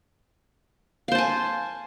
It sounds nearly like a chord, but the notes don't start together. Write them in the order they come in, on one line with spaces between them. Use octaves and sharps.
F5 C5 A5 G#5